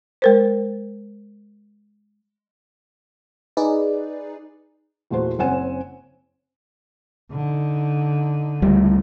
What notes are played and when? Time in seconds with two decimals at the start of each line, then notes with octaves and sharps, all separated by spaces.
0.22 G#3 A#4 C5
3.57 D#4 G#4 B4 D5
5.10 E2 A#2 A3 F#4 C5
5.39 F#1 C4 C#4 F#5 G#5 E7
7.31 D3 D#4
8.62 C#2 G3 A3